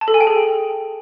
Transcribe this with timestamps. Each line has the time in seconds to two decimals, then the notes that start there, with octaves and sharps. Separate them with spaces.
0.01 A5
0.08 A4
0.14 G#5
0.21 G5
0.27 G#4